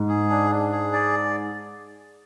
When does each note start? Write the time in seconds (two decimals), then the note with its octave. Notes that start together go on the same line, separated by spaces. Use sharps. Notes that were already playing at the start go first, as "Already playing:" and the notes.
Already playing: G#2
0.08 G#4
0.30 D4
0.51 D4
0.72 G#4
0.93 D5